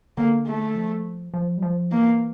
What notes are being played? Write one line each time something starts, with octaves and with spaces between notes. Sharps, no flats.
D3 A#3
A3
F3
F3
G3
F3
E3 A#3